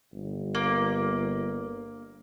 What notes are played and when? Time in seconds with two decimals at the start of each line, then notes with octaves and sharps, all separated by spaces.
0.13 G1
0.55 A#3